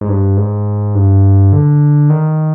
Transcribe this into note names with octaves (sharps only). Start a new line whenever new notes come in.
G#2
G2
G#2
G2
D3
D#3